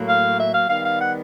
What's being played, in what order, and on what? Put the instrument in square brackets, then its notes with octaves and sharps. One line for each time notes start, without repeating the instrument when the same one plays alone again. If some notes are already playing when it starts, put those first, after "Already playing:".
Already playing: [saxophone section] A2 F#3 A#3
F5
E5
F5
D#3 G3 B3 F5
F5
F#5